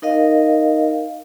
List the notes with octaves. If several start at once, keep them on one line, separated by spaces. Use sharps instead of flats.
D#4 A#4 D#5 F5